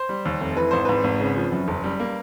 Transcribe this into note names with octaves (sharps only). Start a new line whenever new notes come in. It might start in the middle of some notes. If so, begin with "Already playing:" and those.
Already playing: C5
G3
D#2
F1
E3 B4
G#1 C5
G#2 B4
G#1
C#3
F3
F#2
F#1
G3
A#3